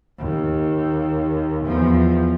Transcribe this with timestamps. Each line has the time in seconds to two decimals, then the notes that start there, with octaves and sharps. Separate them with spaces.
0.19 D#2
1.65 E2 F3